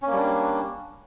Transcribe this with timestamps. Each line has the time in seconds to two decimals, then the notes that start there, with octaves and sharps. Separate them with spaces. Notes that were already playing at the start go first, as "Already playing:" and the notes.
0.02 C#4
0.07 A#3
0.12 G3
0.17 D4